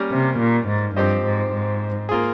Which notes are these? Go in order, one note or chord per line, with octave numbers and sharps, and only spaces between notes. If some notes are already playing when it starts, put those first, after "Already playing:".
Already playing: G3 A#3 C#4 G4 A#4
C3
A#2
G#2
G2 F3 C4 G4 C5 D#5
G#2
G#2
A#3 F4 G#4